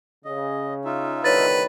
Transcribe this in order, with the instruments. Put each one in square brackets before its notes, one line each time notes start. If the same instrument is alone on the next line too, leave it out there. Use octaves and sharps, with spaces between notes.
[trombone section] C#3 [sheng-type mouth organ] D#5
[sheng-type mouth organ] D#4 F4 E5
[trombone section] C2 D3 D#3 [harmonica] B4 [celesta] C#5 A6